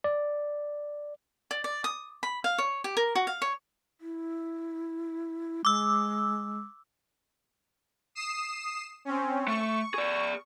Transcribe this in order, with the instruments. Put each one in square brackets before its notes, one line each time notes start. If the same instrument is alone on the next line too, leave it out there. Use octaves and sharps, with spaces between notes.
[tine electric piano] D5
[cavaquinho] D5
D5
D#6
B5
F5
C#5
G4
A#4
F#4
F5
C#5
[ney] E4
[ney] G#3 [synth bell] D6 E6
[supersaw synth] D#6 C7 E7
C4 C#4
[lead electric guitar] A3 [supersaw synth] C#6
[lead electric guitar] G#4 D5